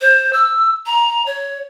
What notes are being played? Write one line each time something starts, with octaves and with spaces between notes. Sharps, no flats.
C5
E6
A#5
C#5